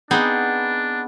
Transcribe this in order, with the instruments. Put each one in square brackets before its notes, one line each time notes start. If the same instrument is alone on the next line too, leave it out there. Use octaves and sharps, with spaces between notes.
[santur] B3 [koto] C4 D#4 G#4 [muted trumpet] D4